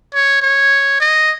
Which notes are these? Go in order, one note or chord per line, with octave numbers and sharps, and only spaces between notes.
C#5
C#5
D#5